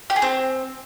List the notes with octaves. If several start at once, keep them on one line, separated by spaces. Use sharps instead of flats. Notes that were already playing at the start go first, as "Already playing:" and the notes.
G4
G#4
C4